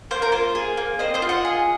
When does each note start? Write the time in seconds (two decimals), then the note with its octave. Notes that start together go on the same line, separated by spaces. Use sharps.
0.11 A#3 C5
0.22 A#4
0.32 F4 C5
0.55 G#4
0.77 A#3
0.99 C4 C5 D#5
1.14 C5 D#5
1.22 F4
1.29 D#5 F#5
1.45 G#4